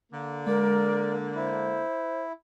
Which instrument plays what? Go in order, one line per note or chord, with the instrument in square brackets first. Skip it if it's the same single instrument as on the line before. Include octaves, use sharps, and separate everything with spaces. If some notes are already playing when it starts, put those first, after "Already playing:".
[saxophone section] D3 A#3
[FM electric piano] G#3 [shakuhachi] A#4 [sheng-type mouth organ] D5
[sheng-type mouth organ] E4 [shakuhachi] C5